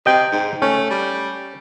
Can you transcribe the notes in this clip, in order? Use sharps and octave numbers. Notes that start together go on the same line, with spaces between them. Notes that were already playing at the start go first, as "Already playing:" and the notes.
C3 D#5 G5
G#2
A3 C#4
G3